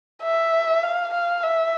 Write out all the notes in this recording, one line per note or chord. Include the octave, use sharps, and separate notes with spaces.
E5
F5
F5
E5